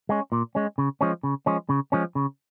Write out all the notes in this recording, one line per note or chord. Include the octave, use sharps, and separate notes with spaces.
G#3 C#4
A#2
G#3 C#4
C#3
F3 G#3 C#4
C#3
F3 G#3 C#4
C#3
F3 G#3 C#4
C#3